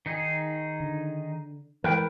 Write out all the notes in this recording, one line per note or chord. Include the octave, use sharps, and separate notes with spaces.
D#3 D#4 G#4
D3
E3 G#3 A#4 B4 G5